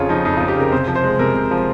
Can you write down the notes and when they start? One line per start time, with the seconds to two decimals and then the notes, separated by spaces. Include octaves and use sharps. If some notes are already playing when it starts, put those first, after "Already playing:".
Already playing: F2 C#3 F4 C#5
0.09 F3 D#4
0.25 F2 D#4
0.37 F4
0.40 F2
0.48 G4
0.57 C#3 A#4
0.72 C3 C5
0.87 F3
0.96 C5
1.04 G#3
1.19 C3 A#4
1.34 C3
1.51 F3